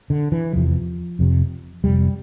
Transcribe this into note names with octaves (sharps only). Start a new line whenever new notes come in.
D3
E3
F1 E2 C3 F3
F1 F2 C3
F1 F2 C3 G3